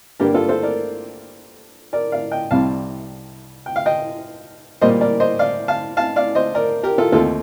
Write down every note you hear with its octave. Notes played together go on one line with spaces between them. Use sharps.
G2 D3 G3 A#3 G4 A#4
F4 A4
A4 C5
A#4 D5
A#4 D5
D5 F5
D#5 G5
C2 C3 G3 C4 F5 A5
G5
F5
D#5 G5
A#2 G3 A#3 C5 D#5
A#4 D5
C5 D#5
D5 F5
F5 A5
F5 A5
D5 F5
C5 D#5
A#4 D5
G4 A#4
F4 A4
D#2 D#3 A3 C4 F4 A4